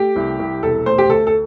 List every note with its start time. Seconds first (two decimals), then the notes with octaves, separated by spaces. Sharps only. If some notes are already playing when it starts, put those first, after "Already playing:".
Already playing: A3 G4
0.16 C2
0.39 C2
0.63 E1 A4
0.86 A3 C5
0.98 G4
1.09 D2 A4
1.27 A4